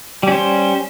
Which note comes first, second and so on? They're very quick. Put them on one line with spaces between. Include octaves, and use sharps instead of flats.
G3 C#4 C5